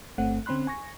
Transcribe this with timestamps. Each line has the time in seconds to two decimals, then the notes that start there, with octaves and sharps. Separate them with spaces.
0.18 G1 A3 C4 F#5
0.46 D3 C4 C#4 B5 C6 F#6
0.67 G#5 C#6 A#6